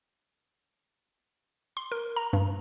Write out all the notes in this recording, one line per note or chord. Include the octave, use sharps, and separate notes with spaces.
C6
A#4
A#5
G2